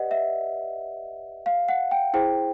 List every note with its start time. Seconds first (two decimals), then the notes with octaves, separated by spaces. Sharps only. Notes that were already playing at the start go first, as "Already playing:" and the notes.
Already playing: G4 B4 D5 D#5 F#5
0.11 E5
1.46 F5
1.69 F#5
1.91 G5
2.14 E4 G#4 C5 G5